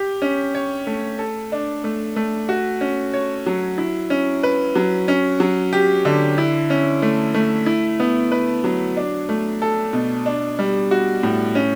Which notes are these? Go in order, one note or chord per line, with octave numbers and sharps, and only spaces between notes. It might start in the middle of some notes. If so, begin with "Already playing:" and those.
Already playing: G4
C#4
C#5
A3
A4
D4
A3
A3
F#4
C#4
C#5
F#3
E4
C#4
B4
F#3
C#4
F#3
G4
D3
E4
C#4
A3
A3
E4
B3
B4
F#3
D4
A3
A4
B2
D4
G3
F#4
A2
C#4